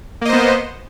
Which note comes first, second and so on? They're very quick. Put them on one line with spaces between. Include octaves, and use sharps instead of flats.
A#3 D#5 C5 B3